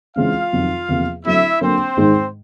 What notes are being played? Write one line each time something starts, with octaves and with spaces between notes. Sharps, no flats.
C#3 E3 G#3 C4 F4 F5
F2 C3 D#3 F#3
E2 C3 F3 A#3
D3 F#3 A3 C4 E4 E5
D3 F#3 A#3 C4 C5
G#2 D#3 G#3